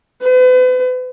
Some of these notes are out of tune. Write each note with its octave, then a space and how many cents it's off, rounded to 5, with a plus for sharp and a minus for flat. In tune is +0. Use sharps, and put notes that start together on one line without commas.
B4 +40